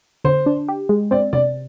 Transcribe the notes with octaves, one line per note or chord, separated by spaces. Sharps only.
D3 C5
D4
G4
G#3
C4 D5
C3 D5